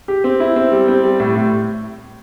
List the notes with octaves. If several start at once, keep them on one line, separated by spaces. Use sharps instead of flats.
G4
C4
E4
C4
G3
C4
G3
A2
A2